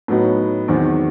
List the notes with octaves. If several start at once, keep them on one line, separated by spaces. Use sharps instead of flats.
A2 F#3 B3 D#4 F#4
E2 D#3 F#3 C4 F#4